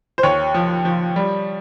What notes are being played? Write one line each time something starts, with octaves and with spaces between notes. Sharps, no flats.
C5
D#2 C#5
F3
F3
G3